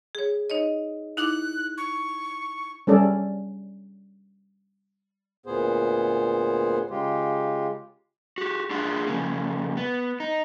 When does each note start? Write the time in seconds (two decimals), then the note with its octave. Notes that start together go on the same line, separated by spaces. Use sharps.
0.15 G#4 C#5
0.50 D#4 C#5 D#5
1.17 D#4 E4 D6 F#6
1.78 C#6
2.87 G3 C#4 A4 D5
5.46 D2 A#2 B3 G#4 C5
6.90 C#3 G#3 F4 G4
8.38 F#4 G4
8.71 D4 F4 G#4 F#5
9.07 F2 C#3 A#3
9.77 B3
10.20 D#4